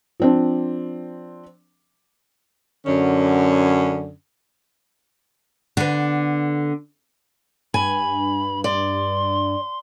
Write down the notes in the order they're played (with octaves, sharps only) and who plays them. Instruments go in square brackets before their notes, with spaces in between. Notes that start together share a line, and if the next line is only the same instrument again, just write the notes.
[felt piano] F3 C4 D4
[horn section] F#2 D3 C#4
[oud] D3 B3
[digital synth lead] G2 [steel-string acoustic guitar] G#5 [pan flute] B5
[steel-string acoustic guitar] D5 [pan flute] C6